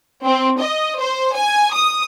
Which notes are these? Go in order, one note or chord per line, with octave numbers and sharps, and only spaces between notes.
C4
D#5
C5
G#5
D#6